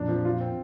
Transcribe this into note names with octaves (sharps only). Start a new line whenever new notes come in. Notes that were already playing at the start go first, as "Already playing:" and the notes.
Already playing: F2 A#2 D4
F3
F4
C4